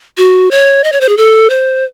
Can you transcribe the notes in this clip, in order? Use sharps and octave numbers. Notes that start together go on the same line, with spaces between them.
F#4
C#5
D#5
C#5
C5
G#4
A4
C5